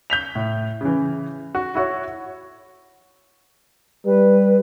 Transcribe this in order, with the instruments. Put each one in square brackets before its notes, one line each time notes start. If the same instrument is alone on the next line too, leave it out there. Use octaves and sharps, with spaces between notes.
[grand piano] G6 B6 F7
A2
C#3 E3
F#4
E4 F#4 C#5
[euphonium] G3 [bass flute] B4